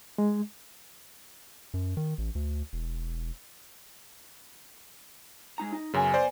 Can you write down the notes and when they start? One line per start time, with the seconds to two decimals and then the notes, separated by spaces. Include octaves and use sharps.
0.18 G#3
1.74 F#2
1.97 D#3
2.18 A1
2.35 D2
2.73 E1
5.58 G#3 D#4 A#5
5.72 D#4
5.94 F#2 C#3 B3 G#5
6.14 C5 D5